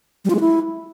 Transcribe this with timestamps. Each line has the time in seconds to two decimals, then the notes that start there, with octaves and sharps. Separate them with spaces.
0.25 G3
0.30 F4
0.35 G#3
0.40 E4